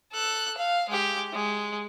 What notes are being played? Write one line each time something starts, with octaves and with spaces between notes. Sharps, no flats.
A4 F#6
F5
G#3 G4
G#3